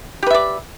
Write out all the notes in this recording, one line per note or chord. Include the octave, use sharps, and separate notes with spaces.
G4 B4 D5 E5